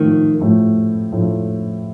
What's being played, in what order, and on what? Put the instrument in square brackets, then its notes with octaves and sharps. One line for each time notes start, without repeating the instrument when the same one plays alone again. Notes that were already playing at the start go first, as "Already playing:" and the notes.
Already playing: [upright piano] A2 F3 A3 [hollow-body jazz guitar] D#3
[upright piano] A2 F3 A3
A2 F3 A3